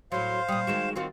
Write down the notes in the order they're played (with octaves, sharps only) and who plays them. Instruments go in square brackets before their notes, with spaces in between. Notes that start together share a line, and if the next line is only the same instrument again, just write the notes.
[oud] A2 F#3 [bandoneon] C5 F5 [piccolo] C6
[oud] A#2 G3 [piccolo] D#6
[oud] D#3 G#3 F#4 [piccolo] E7
[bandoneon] D#3 [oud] C4 F4 F#4 [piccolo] F5